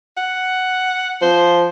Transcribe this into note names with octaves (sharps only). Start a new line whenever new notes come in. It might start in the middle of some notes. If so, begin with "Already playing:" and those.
F#5
F3 C5